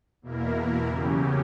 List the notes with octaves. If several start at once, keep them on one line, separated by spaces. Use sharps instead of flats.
E2 B2 A#3 E4 A#4
E2 C#3 F#3 C#4 G4